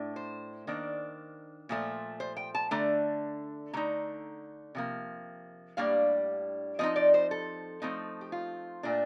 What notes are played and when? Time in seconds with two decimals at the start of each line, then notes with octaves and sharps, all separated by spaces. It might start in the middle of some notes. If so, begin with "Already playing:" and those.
Already playing: A2 A3 D4
0.16 C5
0.67 D#3 A#3 D4
1.69 A#2 F3 A3
2.20 C5
2.37 G5
2.55 A5
2.71 D3 A3 D4 A#5
3.73 D3 A3 D#4 A#5
4.75 C3 F3 A#3
5.77 A2 G3 A#3 D4 F5
6.79 F3 C4 D#4 D#5
6.96 D5
7.14 C5
7.31 A4
7.82 F3 A3 C4 D#4
8.21 G4
8.32 F4
8.83 A#2 A3 D4